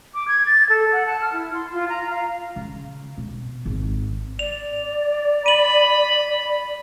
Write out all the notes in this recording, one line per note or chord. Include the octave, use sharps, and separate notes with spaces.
D6
G#6
A6
A4
F#5
A5
F6
E4
C6
F4
A#5
F5
C#3
B2
G#1
D5 F7
B5 D#7 F#7